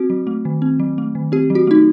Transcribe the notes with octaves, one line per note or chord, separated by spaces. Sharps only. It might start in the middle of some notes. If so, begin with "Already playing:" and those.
Already playing: C4 F#4
F#3
A3
D#3
C4
F#3
A3
D#3
C4 G4
F#3
F#4
A3 D#4